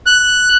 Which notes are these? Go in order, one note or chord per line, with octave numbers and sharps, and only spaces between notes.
F#6